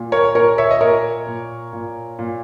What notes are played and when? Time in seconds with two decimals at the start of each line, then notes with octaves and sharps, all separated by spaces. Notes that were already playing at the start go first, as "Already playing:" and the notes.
Already playing: A#2
0.12 A#4 C#5
0.35 A#2 A#4 C#5
0.58 C#5 E5
0.71 D#5
0.81 A#2 A#4 C#5
1.27 A#2
1.73 A#2
2.19 A#2